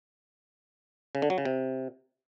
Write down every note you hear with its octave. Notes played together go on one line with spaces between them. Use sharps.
C#3
D3
F#3
C#3
C3